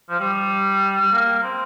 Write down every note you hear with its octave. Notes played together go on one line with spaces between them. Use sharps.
F3
G3
G3
A#3
C4